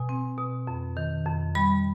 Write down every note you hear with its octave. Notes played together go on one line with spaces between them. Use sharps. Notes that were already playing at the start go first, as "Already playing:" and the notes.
Already playing: B2 G#5
C4
B2
F2
D#3
F2
G3 B5